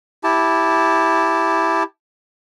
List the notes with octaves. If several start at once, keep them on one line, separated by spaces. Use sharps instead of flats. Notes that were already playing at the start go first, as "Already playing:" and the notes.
E4 G4 A5